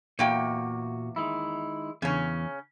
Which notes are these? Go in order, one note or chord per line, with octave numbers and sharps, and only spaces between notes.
E2 A#2 A#3 F#4 G5
D#3 G#3 E4
E2 C#3 C#4